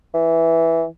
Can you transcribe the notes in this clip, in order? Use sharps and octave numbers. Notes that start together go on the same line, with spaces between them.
E3